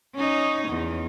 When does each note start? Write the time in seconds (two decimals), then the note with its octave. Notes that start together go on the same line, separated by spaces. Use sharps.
0.15 C#4 D#4
0.68 E2